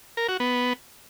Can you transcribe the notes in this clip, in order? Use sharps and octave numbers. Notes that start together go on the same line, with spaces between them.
A#4
F#4
B3